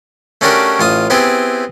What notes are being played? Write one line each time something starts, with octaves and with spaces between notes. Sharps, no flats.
A3 C#4 D4 F#4 G4 A#4
A1 F4 D#6
B3 C4 E4 G4 G#4